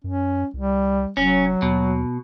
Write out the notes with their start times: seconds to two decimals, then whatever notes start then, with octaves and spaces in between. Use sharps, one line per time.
0.04 F#2 C#4
0.54 C2 G3
1.17 F1 F#3 C#4
1.62 D#2 B2